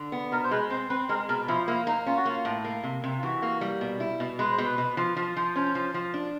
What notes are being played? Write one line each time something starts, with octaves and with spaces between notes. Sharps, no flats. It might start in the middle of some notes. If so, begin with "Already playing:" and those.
Already playing: D3
B3
B2 A#4
C5
G#3 B4
C4 C5
C4 B4
G#3 A#4
B2 A#4
F3 E4
A#3 E4
A#3 D#4
C#4 F4
F#4
A#3 F4
A2
A#3
C3
C3
F4
E3 F#4
A#3
G3
B2
E4
B2
G#3 B4
C5
B2
B4
B2
F3
F3
F3
C#4 C5
F3
F3
D4